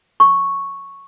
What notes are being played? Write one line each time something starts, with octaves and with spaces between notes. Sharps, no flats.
C#6